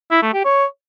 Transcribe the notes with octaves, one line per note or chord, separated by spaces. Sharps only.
E4
A3
G4
C#5